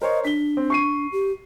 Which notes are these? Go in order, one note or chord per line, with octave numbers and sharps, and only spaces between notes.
A#4 C5 C#5 D#5
D4 B6 G7
C4
C#6 C7 D#7
G4